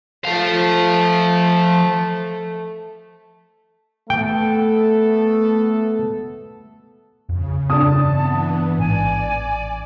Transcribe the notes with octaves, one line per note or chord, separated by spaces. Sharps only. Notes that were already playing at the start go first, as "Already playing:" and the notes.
F3 A3 F5
A3 B3 A4 G5
F2 C#3
G2 C4 D4 A5 D#6
E3 B3
A1 G#2 D5 G#5